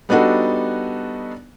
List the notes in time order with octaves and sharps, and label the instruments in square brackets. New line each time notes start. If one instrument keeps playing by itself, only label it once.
[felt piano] G3 B3 D4 D#4 F#4 A4